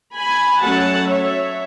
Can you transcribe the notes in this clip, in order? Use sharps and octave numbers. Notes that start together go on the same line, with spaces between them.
G#5 B5
F#3 A3 C#4 F#5 A5
C#5 E5